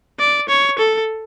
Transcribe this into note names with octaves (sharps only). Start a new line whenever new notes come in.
D5
C#5
A4